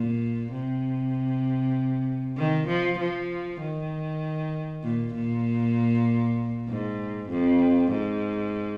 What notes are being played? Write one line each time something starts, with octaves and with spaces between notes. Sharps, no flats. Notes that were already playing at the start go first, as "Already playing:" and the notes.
Already playing: A#2
C3
D#3
F3
F3
D#3
A#2
A#2
G#2
F2
G#2